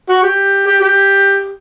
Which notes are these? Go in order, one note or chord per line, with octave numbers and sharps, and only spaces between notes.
F#4
G4
G4
G4